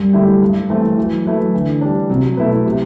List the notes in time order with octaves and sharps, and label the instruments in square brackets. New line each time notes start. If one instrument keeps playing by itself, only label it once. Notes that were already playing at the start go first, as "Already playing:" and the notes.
Already playing: [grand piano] F#2 [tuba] G3
[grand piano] D3 A3 E4 G4
G2
E3 A3 C4
[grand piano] E3 [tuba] F#3
[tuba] F#3 [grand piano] A3 E4 B4
[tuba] D3 [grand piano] E3
[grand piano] G3 D4
[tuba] C3 [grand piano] F#3
[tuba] B2 [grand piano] A3 E4 B4
[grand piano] C3